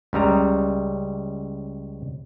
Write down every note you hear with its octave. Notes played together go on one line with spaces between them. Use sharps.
C#2 C#3 G3 A#5